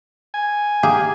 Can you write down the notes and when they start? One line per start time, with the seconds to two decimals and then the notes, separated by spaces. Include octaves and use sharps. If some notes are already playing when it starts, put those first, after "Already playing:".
0.34 G#5
0.83 A#3 G4 G#4